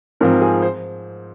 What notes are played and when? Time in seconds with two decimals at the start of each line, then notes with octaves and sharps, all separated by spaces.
0.21 G#2 F3 C4 A#4
0.42 G#4
0.62 C5